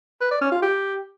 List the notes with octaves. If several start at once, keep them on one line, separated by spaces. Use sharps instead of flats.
B4
D5
C#4
F4
G4